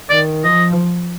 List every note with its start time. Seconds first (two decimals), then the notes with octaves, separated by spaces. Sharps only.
0.10 D#3 D5
0.44 F3 D#5